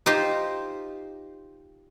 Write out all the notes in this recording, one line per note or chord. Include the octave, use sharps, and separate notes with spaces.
D#4 F4 G4 C5